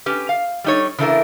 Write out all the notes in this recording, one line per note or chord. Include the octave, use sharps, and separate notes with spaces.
C#4 G4 B4
F5
G3 D#4 C#5
C#3 E3 A3 D4 E4 A#4